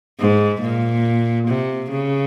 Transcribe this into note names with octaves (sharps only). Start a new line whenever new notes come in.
G#2
A#2
C3
C#3